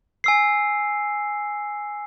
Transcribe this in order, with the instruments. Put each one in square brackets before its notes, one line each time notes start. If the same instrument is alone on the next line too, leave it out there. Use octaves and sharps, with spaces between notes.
[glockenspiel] G#5 E6 C7